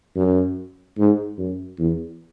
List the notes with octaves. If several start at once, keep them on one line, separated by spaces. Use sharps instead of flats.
F#2
G#2
F#2
E2